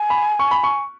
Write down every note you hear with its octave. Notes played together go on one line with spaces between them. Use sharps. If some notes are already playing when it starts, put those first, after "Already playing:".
Already playing: G#5
B5
C#6
B5
C#6